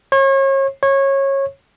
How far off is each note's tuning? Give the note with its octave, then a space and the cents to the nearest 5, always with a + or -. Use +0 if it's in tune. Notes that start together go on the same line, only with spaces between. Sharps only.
C#5 -35
C#5 -20